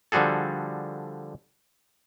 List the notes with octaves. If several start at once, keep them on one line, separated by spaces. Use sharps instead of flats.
D3 F3 G3 F#4 G#4 A4